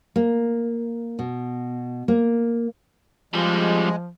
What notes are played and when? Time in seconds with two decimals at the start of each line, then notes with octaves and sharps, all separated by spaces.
0.16 A#3
1.19 B2
2.08 A#3
3.34 F2 F3 G3 G#3 F4